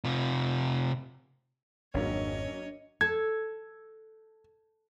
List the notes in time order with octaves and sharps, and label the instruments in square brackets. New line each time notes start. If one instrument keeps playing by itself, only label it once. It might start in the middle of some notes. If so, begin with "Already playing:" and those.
[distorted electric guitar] C3 F4
[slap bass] G#1 F2 [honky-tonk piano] F#3 A#3 C#4 [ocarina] D4 [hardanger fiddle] C#5 D#5
[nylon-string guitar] A4 [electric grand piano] G#6